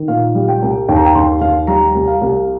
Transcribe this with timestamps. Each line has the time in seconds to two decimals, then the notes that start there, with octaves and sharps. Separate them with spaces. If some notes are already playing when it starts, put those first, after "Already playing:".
Already playing: D#3
0.08 A#2 F5
0.35 G3
0.48 G5
0.62 C2
0.89 D#2 G5
0.96 A#5
1.05 G5
1.15 D#2 C6
1.41 D#2 F5
1.67 G3 A#5
1.95 C2
2.07 F5
2.21 C2